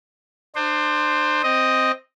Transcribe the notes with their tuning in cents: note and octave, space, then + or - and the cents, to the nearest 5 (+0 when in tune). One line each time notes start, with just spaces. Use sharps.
D4 +35 C5 +0
C4 +0 D#5 +0